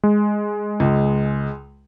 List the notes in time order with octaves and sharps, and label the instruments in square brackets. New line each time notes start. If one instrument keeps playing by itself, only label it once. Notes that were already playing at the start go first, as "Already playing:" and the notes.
[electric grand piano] G#3
[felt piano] C#2